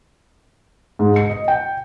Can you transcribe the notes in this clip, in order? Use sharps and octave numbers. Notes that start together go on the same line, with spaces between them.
G#2
C#7
D#5
G5